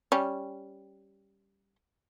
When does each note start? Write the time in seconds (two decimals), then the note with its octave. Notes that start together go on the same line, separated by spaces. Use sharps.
0.12 G3 C#4